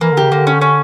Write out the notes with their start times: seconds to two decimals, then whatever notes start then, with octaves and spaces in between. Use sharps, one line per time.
0.01 E3 A#3
0.12 D3
0.17 C#3 G4
0.31 D3 A#3
0.47 C#4
0.61 C#4